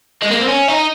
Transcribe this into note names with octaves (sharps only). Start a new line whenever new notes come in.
G#3
A#3
C4
C#4
D#4